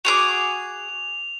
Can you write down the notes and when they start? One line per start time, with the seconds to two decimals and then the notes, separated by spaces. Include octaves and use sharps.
0.05 F#4 G#4 D6 F7